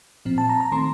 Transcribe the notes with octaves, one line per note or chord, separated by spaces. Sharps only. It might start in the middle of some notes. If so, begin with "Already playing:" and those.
A#2 F3 C4
A5
A#5
A#5
D#3 A3 C4 C6